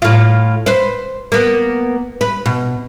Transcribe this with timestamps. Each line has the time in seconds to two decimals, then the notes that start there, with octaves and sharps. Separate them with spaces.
0.02 A2 F4
0.66 B4 C5
1.32 A#3 B3
2.21 B4
2.46 B2